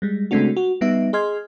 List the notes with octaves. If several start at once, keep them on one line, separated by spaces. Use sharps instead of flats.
G3 G#3
C#3 G#3 A3 C4 D4 F#4
F#4
G3 B3 D#4 E5
G#4 D#5 C6 F6 G#6